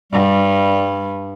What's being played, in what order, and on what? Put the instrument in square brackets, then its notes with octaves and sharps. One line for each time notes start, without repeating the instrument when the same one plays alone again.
[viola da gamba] G2 [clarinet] G3